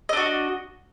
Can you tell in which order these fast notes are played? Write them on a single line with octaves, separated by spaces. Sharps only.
D#5 D4 F#4